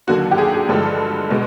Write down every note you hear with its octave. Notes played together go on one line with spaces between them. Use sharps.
D#2 D3 F#3 A#3 F#4
G4
G#4
G#4
G2 D3 F3 G#3 A4
B2 G#3